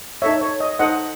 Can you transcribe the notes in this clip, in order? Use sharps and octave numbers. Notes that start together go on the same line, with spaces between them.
D#4 A4 C#5 E5
C#5
D#5
D#4 A4 C5 D#5 F#5